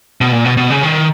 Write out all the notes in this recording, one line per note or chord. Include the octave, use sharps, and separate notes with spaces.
B2
A#2
B2
B2
C#3
D#3